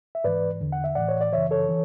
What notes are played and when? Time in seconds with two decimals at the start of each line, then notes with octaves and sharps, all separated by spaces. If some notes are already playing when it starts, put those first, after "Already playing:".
0.15 E5
0.24 G#2 E3 B4 D5
0.60 E2 D3
0.72 F#5
0.84 E5
0.95 A2 E3 D5 F#5
1.09 C#5
1.21 D5
1.33 F#2 C#3 E3 C#5 E5
1.51 A4 C#5
1.69 E3